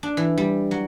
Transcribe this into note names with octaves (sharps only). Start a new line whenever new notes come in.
D4
E3
G3
F#3